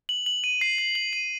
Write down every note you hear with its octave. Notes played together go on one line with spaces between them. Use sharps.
F#7
F#7
D#7
C7
C7
F#7
D#7